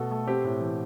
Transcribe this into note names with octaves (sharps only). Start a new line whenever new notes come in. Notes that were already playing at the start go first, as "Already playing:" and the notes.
Already playing: B2 A3 A4
A3
C4 G4
A2
E3